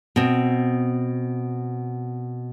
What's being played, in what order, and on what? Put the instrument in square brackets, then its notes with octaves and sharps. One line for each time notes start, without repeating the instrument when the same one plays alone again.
[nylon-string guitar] B2 C4